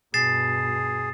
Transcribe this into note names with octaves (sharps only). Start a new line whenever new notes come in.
G2 B2 G#4 A6 C7 E7